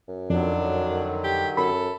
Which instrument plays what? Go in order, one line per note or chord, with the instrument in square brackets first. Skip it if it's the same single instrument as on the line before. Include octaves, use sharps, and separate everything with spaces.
[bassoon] F#2
[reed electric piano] F2 [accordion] D3 D#3 F#3 [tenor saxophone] D4
[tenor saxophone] G4
[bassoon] F#2 [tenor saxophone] A4 [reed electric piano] B5